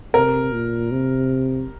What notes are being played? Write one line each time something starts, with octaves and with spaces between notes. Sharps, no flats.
C3 A#4
A#2
C3